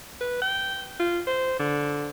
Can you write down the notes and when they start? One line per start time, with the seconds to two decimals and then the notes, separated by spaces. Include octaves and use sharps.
0.21 B4
0.42 G5
0.99 F4
1.27 C5
1.59 D3